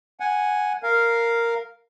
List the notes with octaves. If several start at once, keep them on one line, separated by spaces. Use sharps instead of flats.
F#5 G#5
A#4 F5